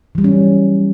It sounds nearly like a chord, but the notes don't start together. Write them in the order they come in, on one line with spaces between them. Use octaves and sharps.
E3 G3 F#3 C#4